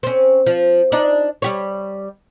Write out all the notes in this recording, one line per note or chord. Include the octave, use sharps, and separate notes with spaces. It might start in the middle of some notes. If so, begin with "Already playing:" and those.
C4 C#4
F3
D4 D#4 D5
G3 G4 C#5